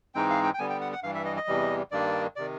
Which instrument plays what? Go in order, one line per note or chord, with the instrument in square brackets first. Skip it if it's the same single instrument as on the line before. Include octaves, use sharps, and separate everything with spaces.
[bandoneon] G#2 E3 G#3 C4 D#4 G5
F5
G5
G5
D3 G3 B3 G#5
G5
F#5
F#5
G2 E3 G3 F5
E5
D#5
D#5
E2 C3 E3 G3
G2 D#3 G3 A#3 D4 D5
C3 D#3 D5